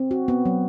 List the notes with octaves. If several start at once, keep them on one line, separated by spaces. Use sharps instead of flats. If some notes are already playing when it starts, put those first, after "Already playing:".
Already playing: C4
F#4
B3
F#3